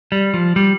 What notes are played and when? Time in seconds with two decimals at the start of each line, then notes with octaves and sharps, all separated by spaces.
0.12 G3
0.34 F3
0.56 G3